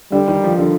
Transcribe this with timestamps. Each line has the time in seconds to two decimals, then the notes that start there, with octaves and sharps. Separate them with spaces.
0.12 D3 G3
0.28 D#3
0.44 F3
0.59 D3